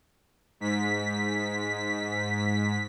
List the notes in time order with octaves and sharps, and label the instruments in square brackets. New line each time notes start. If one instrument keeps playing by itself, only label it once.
[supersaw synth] G#2 B6